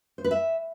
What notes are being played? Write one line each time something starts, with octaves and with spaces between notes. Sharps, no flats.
C5
B4
E5